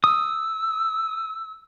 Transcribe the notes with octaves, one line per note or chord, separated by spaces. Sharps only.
D#6 E6